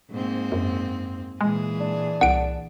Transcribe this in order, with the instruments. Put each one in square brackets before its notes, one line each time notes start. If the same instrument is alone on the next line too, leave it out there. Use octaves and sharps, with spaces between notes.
[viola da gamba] G#2 A#3 C4
[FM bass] F#2
[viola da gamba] A#2 E3 G#4 [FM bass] G#3
[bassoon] D4
[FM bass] C2 [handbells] F#5 D7